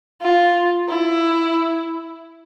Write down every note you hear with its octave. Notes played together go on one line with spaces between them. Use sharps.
F4
E4